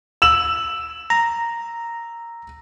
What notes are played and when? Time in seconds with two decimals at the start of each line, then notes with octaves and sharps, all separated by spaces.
0.22 E6 E7 F#7
1.10 A#5